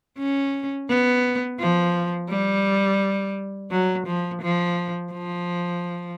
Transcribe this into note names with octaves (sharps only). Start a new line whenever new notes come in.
C#4
B3
F3
G3
F#3
F3
F3
F3